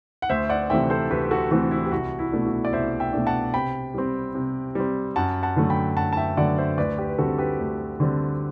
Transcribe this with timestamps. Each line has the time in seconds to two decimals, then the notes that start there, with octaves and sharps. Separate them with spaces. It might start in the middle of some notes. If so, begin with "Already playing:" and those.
0.22 F#5
0.29 D2 C5 E5
0.49 D5 F#5
0.70 C3 E3 A3 C4 E5 G5
0.90 A4 C5
1.10 D2 G4 B4
1.31 F#4 A4
1.51 C3 E3 A3 C4 F#4
1.71 E4
1.86 G4
1.91 C2 F#4
2.19 E4
2.32 B2 A3 D4
2.46 F#4
2.65 D5
2.73 C2 C5 E5
3.00 E5 G5
3.13 B2 A3 D4
3.27 F#5 A5
3.54 C3 G5 B5
3.94 G3 C4
4.35 C3
4.75 G3 C4
5.16 F#2 F#5 A5
5.43 F#5 A5
5.56 D3 F#3 A3
5.70 G5 B5
5.97 F#2 F#5 A5
6.13 A5
6.17 E5 G5
6.37 D3 F#3 A3 D5 F#5
6.58 C5 E5
6.78 D2 B4 D5
6.98 G4 B4
7.09 B4
7.18 D3 G3 C4 F#4 A4
7.38 G4 B4
7.59 D2
8.00 D3 G3 C4